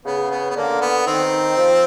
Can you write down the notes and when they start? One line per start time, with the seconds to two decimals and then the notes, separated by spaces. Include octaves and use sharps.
0.05 C#3 B3
0.31 B3
0.50 B3
0.56 D3 A#3
0.81 B3
1.06 D#3 C4
1.58 F3